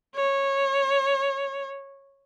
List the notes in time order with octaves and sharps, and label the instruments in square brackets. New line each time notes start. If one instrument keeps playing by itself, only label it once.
[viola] C#5